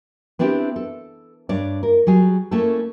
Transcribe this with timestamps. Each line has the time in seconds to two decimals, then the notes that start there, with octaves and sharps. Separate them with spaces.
0.39 B3 C4 D4 E4 F#4 G4
0.76 A4
1.49 G2 D4 C#5 D5
1.83 A#4
2.07 F#3 G3 G#4
2.51 A3 A#3 C#4 E4 A4